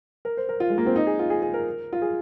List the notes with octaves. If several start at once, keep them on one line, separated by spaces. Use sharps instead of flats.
A#4
C5
A#4
F4
G#3
A#3
C4
D#4
G#4
F4
G#4
G#4
A#4
F4
G#4